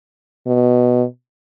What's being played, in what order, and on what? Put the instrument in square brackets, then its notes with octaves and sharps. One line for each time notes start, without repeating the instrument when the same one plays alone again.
[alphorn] B2